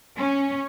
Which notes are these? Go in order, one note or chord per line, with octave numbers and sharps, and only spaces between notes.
C#4